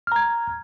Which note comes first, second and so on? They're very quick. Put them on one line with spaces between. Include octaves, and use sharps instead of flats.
F6 A#5 G#6